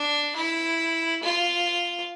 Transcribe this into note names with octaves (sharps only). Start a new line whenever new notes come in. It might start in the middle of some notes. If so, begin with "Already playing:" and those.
Already playing: D4
E4
F4